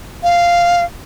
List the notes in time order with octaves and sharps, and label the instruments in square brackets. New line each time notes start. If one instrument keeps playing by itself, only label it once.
[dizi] F5